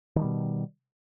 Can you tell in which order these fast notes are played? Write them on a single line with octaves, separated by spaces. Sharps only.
D#3 F3 G3 B2